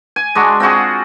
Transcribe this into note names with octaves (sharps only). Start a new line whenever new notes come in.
G#5
G#3 D4 F#4
C4 F4 F#4 G#4